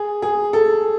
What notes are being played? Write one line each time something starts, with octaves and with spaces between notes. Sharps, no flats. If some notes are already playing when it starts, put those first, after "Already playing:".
Already playing: G#4
G#4
A4